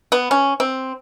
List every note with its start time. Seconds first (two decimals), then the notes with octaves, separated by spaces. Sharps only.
0.12 B3
0.31 C#4
0.60 C4